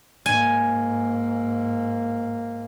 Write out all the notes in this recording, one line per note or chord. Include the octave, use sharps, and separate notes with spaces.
G#2 A#3 G#5